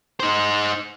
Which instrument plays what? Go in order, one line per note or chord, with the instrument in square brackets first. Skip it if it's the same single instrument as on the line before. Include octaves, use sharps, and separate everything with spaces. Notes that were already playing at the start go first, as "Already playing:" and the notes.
[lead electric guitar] D#4 C5